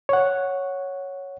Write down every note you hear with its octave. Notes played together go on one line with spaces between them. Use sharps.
C#5 F#5